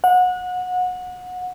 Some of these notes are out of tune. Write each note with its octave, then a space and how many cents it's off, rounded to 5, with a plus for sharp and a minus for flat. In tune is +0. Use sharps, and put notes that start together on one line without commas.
F#5 -25